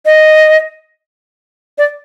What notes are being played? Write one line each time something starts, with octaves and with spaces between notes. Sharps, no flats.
D#5
D5